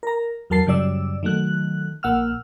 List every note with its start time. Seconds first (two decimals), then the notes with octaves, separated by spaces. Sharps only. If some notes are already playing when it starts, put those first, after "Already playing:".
0.03 A#4 A#5
0.50 E2 F#3 A#4 A5 C7
0.67 F#2 C#3 G3 D5 E6
1.23 D#3 F#3 A3 F#6
2.03 A#1 A#3 F#5 E6 F6